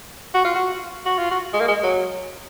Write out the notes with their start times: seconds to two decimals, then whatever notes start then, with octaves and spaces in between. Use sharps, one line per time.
0.34 F#4
0.45 F4
0.55 F#4
1.06 F#4
1.18 F4
1.31 F#4
1.53 G#3
1.60 A#3
1.68 G#3
1.83 F#3